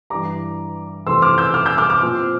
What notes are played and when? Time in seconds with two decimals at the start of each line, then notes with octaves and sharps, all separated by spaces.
0.10 G2 E3 G3 A#5 D6
1.06 F2 C3 E3 A3 C4 C6 E6
1.22 D6 F6
1.38 E6 G6
1.54 D6 F6
1.66 E6 G6
1.78 D6 F6
1.90 D6 F6
2.02 A#2 F3 C4